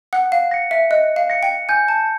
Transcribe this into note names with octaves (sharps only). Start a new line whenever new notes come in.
F#5 F#6
F5
A#6 C#7
E5
D#5 F#6
F5
A#6 C#7
G5
G#5 G6
A5